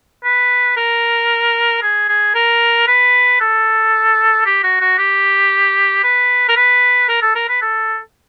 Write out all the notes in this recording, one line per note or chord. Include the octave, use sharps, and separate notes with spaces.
B4
A#4
G#4
G#4
A#4
B4
A4
G4
F#4
F#4
G4
B4
A#4
B4
A#4
A4
A#4
B4
A4